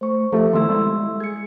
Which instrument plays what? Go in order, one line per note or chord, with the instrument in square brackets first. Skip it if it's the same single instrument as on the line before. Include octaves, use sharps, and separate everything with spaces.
[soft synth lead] A3 [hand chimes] C5 C#6
[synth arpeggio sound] F3 A3 [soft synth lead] G4 [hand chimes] A4 E5
[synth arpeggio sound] D#3 A3 E4 [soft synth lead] B3 [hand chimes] C6 E6
[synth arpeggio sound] G3 E4 [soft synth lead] G#3
[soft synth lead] G#4 [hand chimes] G#6 C#7